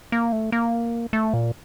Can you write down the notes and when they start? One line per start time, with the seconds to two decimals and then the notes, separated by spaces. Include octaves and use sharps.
0.12 A#3
0.32 A3
0.52 A#3
1.13 A3
1.34 A#2